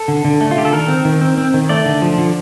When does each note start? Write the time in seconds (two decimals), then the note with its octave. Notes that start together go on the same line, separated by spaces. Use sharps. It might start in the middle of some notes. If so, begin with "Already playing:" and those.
Already playing: A4
0.08 D3
0.25 D3
0.41 A3
0.51 F4
0.57 D3 G4
0.65 A4
0.73 D#3 A#4
0.88 C4
1.05 D#3
1.21 C4
1.38 C4
1.54 D#3
1.69 A3 D5
1.86 D3
2.02 F3
2.18 D3